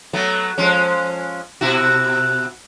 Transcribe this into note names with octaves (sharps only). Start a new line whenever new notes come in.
F#3 A3 B3
F3 G#3 C#4
B2 E4 F#4